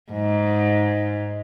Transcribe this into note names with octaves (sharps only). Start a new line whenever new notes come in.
G#2